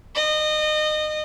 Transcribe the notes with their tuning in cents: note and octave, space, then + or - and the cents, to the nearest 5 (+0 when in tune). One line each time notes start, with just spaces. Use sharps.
D#5 -25